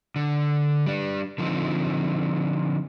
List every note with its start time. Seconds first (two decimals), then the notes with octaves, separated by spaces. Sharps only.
0.16 D3
0.86 G3 D4
1.38 D3 F3 F#3 C4 D#4